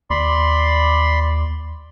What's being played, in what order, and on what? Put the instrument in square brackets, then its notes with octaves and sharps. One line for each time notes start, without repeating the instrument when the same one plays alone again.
[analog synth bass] D#2 [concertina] D5 B5 C6